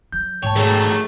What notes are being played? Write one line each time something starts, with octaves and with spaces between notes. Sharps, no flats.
F#3 G6
G#2 B2 C#5 G5 A5
D#3 F#3 A3 G#4 C#5